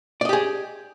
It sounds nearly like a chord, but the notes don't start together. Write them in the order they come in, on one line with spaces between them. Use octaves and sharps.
D5 D#5 G4 G#4